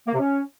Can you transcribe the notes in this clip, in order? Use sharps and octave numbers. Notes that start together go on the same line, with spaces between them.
A#3
C3
C#4